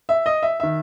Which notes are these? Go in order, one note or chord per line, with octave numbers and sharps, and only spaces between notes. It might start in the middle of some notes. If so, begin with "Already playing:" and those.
E5
D#5
E5
D#3 E5